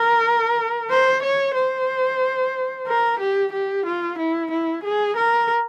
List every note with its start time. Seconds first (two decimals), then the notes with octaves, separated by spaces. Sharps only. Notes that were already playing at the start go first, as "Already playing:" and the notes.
Already playing: A#4
0.90 C5
1.23 C#5
1.54 C5
2.87 A#4
3.19 G4
3.52 G4
3.86 F4
4.18 E4
4.51 E4
4.83 G#4
5.16 A#4